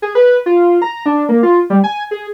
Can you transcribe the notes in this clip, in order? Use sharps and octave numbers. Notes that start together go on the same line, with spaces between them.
G#4
B4
F4
A#5
D4
A#3
F4
G3
G#5
G#4